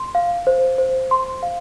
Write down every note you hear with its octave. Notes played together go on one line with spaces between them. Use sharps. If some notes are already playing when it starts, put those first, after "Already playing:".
Already playing: C6
F5
C5
C5
C6
F5